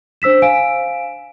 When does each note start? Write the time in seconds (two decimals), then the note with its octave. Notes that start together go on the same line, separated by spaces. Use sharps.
0.22 D4 C5 E6 B6 E7
0.42 F5 G#5 D7